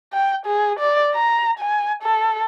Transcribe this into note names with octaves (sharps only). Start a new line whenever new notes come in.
G5
G#4
D5
A#5
G#5
A4